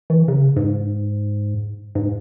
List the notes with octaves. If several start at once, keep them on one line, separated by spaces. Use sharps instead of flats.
E3
C#3
G#2
G#2